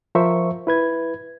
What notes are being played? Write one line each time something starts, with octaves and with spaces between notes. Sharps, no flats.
F3 A#4 C5 E5 C#6
E4 B4 G#6